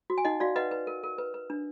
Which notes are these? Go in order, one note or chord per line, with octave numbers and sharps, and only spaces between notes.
F#4
G#5
D#4 D#5 F#5
F#4 D5 F5
B4 D#5 F#5
B4
A#4
A#4
B4
B4
D4